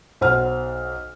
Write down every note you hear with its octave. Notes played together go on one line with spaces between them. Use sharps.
B1 C5 F#5 F6